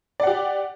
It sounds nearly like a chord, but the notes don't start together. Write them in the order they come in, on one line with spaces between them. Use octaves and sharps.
D5 F#5 G4